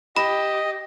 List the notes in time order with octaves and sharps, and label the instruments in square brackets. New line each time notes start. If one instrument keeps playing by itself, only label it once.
[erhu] G4 [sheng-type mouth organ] D#5 [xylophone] B5